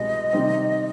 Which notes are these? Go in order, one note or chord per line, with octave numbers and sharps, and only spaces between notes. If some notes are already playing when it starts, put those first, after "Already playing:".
Already playing: C2 B2 G#3 B3 D#5
C3 D#3 G3 C4 D#4